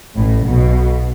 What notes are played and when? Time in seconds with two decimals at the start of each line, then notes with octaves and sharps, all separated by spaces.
0.15 A1 A2
0.46 B1 B2